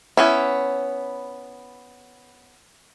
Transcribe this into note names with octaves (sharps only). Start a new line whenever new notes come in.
B3 C#4 E4